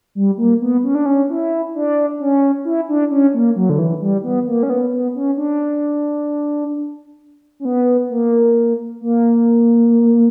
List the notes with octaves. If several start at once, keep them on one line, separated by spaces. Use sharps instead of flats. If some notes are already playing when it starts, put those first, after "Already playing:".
G3
A#3
B3
C#4
D4
C#4
E4
D4
C#4
E4
D4
C#4
A#3
F#3
D3
E3
G3
B3
A#3
C#4
B3
B3
C#4
D4
C#4
B3
A#3
A#3